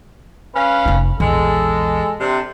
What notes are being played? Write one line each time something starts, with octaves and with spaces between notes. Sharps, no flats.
C#4 B4 F5
F1 D#4
A#1 E2 G#3 A4
C3 D4